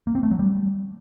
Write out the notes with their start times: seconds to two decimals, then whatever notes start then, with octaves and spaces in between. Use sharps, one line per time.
0.07 A#3
0.15 C4
0.23 A3
0.31 F#3
0.39 G3